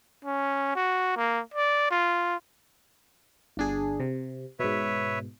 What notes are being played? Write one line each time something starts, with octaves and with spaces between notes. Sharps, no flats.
C#4
F#4
A#3
D5
F4
G1 D4 G#4
C3
G#2 B2 B4 C#5 E5